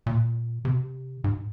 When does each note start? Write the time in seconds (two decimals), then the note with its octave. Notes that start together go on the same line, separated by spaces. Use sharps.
0.06 A#2
0.65 C3
1.24 G#2